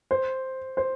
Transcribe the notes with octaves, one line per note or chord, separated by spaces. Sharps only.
C5
C5